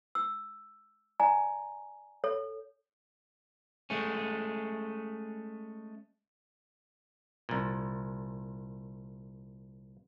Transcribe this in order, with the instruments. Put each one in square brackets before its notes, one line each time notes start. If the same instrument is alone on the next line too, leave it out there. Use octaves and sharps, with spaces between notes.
[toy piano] E6
D5 G#5 A#5
A4 C#5
[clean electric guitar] G#3 A3 C#4
[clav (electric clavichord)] C2 A#2